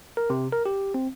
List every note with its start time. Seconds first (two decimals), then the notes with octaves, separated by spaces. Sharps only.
0.17 A#4
0.30 C3
0.53 A#4
0.66 G4
0.94 C4